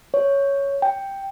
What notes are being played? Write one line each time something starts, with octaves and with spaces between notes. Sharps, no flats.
C#5
G5